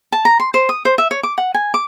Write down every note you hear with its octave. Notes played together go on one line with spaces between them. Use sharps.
A5
A#5
C6
C5
D#6
C5
E5
C#5
D6
F#5
G#5
D6